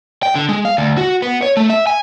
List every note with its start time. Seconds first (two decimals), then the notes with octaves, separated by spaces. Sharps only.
0.23 G5
0.35 D3
0.49 G#3
0.65 F5
0.78 D2
0.98 F#4
1.22 B3
1.42 C#5
1.57 A3
1.70 E5
1.87 G#5